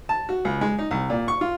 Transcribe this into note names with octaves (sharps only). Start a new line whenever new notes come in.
A5
F#4
C#2
G#3
D#4
C2
A#2
C#6
F4